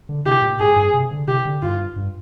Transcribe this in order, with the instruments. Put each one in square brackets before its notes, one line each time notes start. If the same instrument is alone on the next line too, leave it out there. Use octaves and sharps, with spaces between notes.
[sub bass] D3
[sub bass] C3 [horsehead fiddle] G4
[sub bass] A#2
[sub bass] G#2 [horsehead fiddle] G#4
[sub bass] G2
C3
D3
[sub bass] C3 [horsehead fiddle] G4
[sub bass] D3
[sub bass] G2 [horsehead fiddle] F4
[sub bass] G2